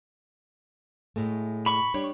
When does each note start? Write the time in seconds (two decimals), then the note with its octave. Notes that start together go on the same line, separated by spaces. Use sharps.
1.16 A2 G#3 A3
1.66 B5 C#6
1.94 G3 D4 C#5